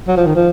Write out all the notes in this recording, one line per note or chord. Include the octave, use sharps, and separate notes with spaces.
F#3
F3
D#3
F3